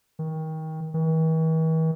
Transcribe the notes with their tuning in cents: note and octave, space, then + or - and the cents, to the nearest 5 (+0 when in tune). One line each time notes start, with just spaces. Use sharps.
D#3 +25
E3 -45